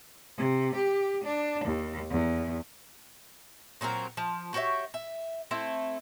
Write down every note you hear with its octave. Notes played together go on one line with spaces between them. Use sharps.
C3
G4
D4
D#2
E2
A#2 F#3 C4 A#4
F3
F#4 G4 C#5 E5
E5
A3 C4 E4